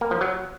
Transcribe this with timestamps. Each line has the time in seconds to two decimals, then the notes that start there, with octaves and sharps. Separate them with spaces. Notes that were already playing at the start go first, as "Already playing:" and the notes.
0.01 A#3
0.11 F3
0.21 F#3